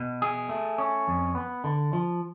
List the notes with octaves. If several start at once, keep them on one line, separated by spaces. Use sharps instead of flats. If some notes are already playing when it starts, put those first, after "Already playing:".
Already playing: B2
G#4
A3
C#4
F2
B3
D3
F3